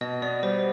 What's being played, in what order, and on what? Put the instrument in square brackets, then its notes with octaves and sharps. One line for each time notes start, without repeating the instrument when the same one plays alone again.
[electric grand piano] B2 [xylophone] D#5
[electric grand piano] B3 [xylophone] D5
[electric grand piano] G3 [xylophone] C5